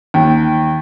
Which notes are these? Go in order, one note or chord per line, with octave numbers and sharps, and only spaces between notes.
D#2